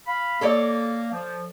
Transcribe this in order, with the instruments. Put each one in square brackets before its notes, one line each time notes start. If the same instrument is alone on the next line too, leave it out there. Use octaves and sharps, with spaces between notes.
[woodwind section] F5 B5
[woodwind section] A#3 [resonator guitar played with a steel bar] A4 C#5 D5
[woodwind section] F3